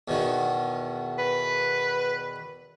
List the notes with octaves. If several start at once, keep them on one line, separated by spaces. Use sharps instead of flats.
E2 B2 D#3
B4